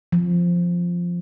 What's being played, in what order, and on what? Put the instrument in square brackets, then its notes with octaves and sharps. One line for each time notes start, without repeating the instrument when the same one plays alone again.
[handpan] F3